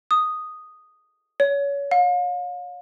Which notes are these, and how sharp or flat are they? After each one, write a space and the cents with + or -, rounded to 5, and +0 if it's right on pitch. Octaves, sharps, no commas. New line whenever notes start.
D#6 -5
C#5 +25
F5 +40